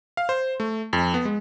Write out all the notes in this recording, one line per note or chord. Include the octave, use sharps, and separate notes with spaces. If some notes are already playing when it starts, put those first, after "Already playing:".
F5
C5
A3
F2
B3
G#3